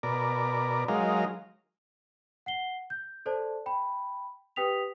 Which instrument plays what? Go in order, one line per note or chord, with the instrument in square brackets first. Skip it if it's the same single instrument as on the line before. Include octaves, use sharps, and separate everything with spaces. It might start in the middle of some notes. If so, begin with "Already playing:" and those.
[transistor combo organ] B2 A#4 D5
F#3 G#3 D#4 A#4 F5
[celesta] F#5 C7 G7
G6
A4 C5 D5 A5
G5 B5
G4 B4 G5 D#6 B6 F7